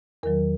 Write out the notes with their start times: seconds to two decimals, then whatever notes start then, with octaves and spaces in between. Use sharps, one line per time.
0.23 E2 D#3 F#3 A#4